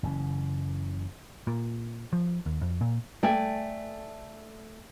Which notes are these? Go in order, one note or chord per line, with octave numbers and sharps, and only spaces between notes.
F#1 C#3 E3 C#4
A#2
F3
D#2
F2
A#2
A3 D5 G5 G#5